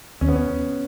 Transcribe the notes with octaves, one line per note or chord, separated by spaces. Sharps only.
D#2 C#4
B3
C#4